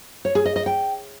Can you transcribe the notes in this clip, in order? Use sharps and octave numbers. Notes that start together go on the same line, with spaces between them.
C#5
G#4
D#5
D#5
G5